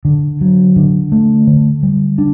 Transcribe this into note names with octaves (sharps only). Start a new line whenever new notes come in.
D3
F#3
D3
A3
D3
G3
D4